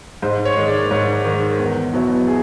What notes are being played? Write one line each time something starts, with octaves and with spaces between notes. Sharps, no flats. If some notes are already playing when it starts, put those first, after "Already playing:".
G#2 C5
C#5
D#3 G#3
D5
G#2 C#5
D#3 G#3
E2
B2 F#3 B3 E4
G#4